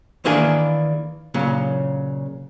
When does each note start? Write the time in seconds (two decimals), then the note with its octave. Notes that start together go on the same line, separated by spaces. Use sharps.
0.25 D#3 E3 A#3 D4 G#4
1.34 A#2 C#3 F#3